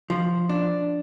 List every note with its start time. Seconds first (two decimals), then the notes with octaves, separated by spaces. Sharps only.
0.10 F3
0.49 D4